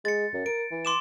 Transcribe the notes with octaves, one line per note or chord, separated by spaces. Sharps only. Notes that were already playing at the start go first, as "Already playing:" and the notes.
G#3 A6 C#7
F#2
A#4 D7
E3
C6 D6 E7